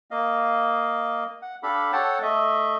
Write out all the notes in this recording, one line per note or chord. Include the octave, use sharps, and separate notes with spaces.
A#3 D#5 F5
F#5
D4 G4 A4 F5 B5
A4 C#5 F#5 G5 A5
A3 D#5 E5